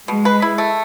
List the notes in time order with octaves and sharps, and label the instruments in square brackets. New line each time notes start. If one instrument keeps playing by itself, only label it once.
[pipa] B2 [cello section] G#3
[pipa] B4
E4
A3